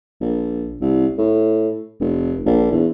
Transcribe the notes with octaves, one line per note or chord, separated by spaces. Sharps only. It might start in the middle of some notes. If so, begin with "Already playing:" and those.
A#1
C2
A2
F1
A#1
E2